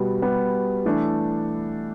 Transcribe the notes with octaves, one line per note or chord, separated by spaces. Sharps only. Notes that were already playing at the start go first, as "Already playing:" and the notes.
Already playing: B2 G3 B3
B2 G3 B3
E3 A3 D4 A4